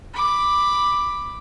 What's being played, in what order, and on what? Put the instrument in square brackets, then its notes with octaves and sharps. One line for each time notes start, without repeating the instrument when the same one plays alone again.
[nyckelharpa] B5 D6